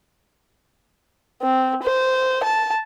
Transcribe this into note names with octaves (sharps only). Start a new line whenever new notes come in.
C4
C5
A5